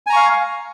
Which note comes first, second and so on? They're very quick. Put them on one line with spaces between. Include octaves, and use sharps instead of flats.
G#5 A#5 C#6 F5